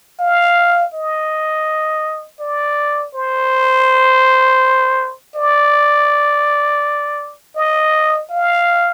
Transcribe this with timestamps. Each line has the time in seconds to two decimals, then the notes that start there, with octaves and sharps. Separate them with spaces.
0.20 F5
0.94 D#5
2.40 D5
3.15 C5
5.36 D5
7.56 D#5
8.30 F5